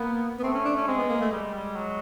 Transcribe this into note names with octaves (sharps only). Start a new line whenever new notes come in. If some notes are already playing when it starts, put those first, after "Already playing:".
Already playing: A#3 B3
B3
A3 C4
C#4
D4
C#4
G#3 C4
B3
A#3
A3
G3 G#3
G3
F#3